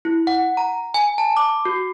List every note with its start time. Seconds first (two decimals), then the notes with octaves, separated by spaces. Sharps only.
0.05 E4
0.27 F#5
0.57 A#5
0.94 G#5
1.18 A5
1.37 D6
1.65 F#4